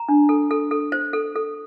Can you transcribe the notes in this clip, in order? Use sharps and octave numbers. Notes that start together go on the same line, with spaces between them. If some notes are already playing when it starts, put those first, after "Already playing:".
Already playing: A#5
D4
A4
A4
A4
C5
A4
A4